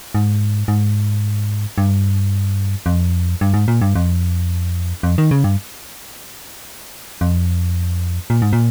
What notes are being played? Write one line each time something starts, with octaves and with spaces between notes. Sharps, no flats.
G#2
G#2
G2
F2
G2
G#2
A#2
G2
F2
F2
D#3
C#3
G2
F2
A#2
G#2
A#2